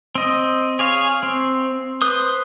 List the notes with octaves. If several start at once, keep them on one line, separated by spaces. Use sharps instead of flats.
C4 D#5
G#4 C#5 F5
C4
B4 C5 D#6